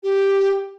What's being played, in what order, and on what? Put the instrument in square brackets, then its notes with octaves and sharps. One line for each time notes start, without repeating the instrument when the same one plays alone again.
[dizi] G4